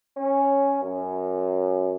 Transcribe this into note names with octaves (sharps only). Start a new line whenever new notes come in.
C#4
F#2